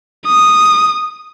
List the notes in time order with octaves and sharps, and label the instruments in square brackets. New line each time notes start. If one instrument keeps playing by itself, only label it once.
[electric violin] D#6